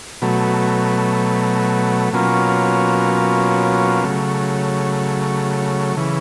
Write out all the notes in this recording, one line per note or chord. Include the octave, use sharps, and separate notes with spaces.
B2 F#3 A3
B2 F#3 A#3 C#4 F4
C#3 F#3 A3
C#3 E3